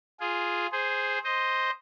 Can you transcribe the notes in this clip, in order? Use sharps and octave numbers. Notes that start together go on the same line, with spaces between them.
F4 G#4
G#4 C5
C5 D#5